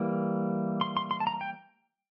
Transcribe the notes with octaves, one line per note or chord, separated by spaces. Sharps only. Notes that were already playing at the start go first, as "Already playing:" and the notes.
Already playing: E3 G3 A#3
C6
C6
C6
A5
A#5
G5